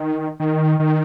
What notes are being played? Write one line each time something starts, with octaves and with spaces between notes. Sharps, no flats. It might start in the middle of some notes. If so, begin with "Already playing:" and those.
Already playing: D#3
D#3
D#3